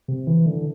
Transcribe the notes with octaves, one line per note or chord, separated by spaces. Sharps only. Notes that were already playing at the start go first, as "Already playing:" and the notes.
C3
E3
D3